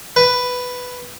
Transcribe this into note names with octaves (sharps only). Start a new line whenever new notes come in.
B4